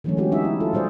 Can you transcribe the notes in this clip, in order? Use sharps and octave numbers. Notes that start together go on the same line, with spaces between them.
D3 E3 F#3 G#3 A3 C#4
G#3 B3 C#4 F#4 G4
D#4 G4 G#4 E5
E4
F4 A4
A#2 G3 G#4 C5 D5